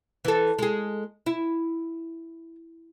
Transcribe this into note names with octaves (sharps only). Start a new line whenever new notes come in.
E3 A4
G#3 G#4
E4